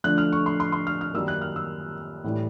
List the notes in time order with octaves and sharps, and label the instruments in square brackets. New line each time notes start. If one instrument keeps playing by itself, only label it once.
[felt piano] D3 F3 A3 D4 F#6
F6
C#6
C6
C6
C6
F6
F6
F#2 D#3 G3 A#3 E6
F#6
F6
E6
A2 E3 G3